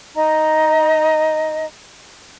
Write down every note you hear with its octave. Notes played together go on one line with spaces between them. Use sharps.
D#4 D#5 A#5